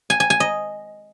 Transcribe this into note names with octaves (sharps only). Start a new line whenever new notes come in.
G#5
G#5
G#5
D#5